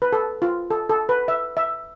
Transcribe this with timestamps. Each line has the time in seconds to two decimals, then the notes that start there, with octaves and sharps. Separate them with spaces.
0.02 B4
0.13 A4
0.42 F4
0.71 A4
0.89 A4
1.09 B4
1.28 E5
1.57 E5